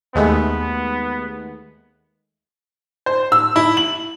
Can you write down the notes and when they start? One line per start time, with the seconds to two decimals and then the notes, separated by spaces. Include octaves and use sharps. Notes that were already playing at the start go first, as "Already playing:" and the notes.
0.15 D#2 G#3 A3 B3
3.06 C5
3.32 E6
3.56 E4
3.77 F#7